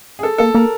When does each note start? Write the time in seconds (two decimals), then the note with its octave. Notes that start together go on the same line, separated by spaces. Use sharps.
0.19 G#4
0.23 A4
0.38 A#3 A4
0.54 A#3 A#4